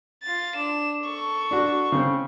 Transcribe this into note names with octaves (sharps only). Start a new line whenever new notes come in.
F4 A6
D4 E7
A4 C#6
D4 F#4
C#3 C4